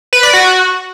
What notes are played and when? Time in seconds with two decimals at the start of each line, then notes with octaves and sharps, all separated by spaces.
0.13 B4
0.23 D5
0.33 F#4